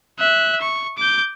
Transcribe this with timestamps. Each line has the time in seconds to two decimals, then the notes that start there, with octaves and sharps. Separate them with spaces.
0.19 E5 F#6
0.62 C#6
0.97 D6 G6